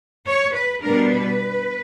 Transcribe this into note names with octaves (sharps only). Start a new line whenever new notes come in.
C#5
B4
B2 G3 B3 D4 A#4
B4